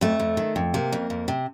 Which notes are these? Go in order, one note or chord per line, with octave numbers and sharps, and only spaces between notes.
F2 A3
F2
D#3
F2
C3 A#3
F2
F2
C3